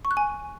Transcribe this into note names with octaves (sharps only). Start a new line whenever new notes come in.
C#6
F#6
G#5